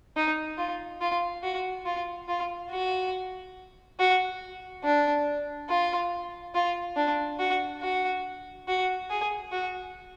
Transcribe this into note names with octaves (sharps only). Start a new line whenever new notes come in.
D#4
F4
F4
F#4
F4
F4
F#4
F#4
D4
F4
F4
D4
F#4
F#4
F#4
G#4
F#4